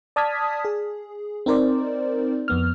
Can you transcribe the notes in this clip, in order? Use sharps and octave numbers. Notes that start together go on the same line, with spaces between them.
D5 A5 D#6 F6 G#6 B6
G#4
C4 D#4 A#4 C5 D5
F2 B3 F6